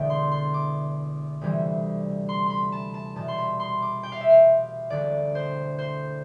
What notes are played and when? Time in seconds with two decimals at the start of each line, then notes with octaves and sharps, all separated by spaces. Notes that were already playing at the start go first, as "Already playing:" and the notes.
Already playing: E1 E2 D3 A3 D5 G5
0.10 C6
0.31 C6
0.54 D6
1.41 D2 C3 E3 G3
2.29 C6
2.46 B5 C6
2.72 A5
2.94 A5
3.16 E2 B2 G3 A5
3.28 C6
3.38 B5
3.60 C6
3.82 D6
4.03 G5
4.12 F5
4.21 E5
4.30 F5
4.90 E1 D2 D3 D5
5.35 C5
5.78 C5